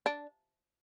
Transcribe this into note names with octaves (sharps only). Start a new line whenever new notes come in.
D4